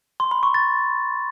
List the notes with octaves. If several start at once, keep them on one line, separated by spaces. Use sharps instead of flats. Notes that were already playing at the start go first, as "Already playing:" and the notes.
C6
B5
C#6
A6